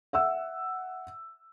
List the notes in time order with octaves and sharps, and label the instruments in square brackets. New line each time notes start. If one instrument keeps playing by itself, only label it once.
[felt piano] E5 F#5 E6